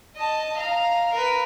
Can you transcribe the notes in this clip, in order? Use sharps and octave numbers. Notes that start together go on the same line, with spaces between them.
D#5 A5
F5 A#5
A#4 B4